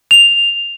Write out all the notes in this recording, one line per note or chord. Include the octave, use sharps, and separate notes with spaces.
F7